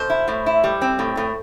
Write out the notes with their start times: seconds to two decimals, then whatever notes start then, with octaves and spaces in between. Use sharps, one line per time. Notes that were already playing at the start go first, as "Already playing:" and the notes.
Already playing: B2 C5
0.10 E4
0.28 A2
0.46 E4
0.64 G3
0.82 C4
0.99 A2
1.17 A2